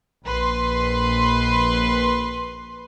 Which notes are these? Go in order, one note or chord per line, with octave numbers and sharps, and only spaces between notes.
A#1 B4 C6